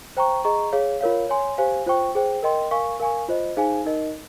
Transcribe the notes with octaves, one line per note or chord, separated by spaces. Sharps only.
C5 G5 A#5 C#6
G#4 D#5 A#5 C#6
G#4 C#5 F5
F4 A#4 C#5 F5
C#5 G#5 C6
G4 C5 F5 G#5
F4 C5 G5 C#6
G#4 C5 G5
A#4 D#5 G5 C6
A#4 F5 G#5 C#6
A#4 F5 G#5 C#6
F4 C5 D#5
D#4 G#4 C5 F5 G#5
D#4 A#4 D#5